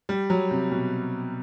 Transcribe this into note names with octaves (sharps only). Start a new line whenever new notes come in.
G3
F#3
C3
B2